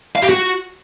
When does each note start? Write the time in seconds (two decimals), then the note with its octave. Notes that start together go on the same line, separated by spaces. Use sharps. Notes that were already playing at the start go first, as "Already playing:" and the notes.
0.16 F5
0.22 G4
0.29 F#4